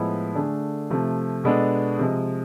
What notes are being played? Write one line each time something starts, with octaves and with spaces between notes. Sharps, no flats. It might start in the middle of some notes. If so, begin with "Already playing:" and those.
Already playing: A2 F3 G#3 B3 E4
D3 A3 D4 G#4
C3 F3 A3
B2 G#3 B3 D4 A4
C3 F3 G#3